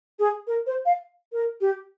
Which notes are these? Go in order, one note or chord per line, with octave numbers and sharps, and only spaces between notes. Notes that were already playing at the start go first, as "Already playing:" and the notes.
G#4
A#4
C5
F5
A#4
G4